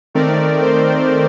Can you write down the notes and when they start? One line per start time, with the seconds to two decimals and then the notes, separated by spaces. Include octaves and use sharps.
0.14 D#3 A3 C4 A#4 D5
0.61 C5